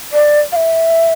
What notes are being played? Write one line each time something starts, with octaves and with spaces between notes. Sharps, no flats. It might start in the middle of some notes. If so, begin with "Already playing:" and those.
D5
F5
E5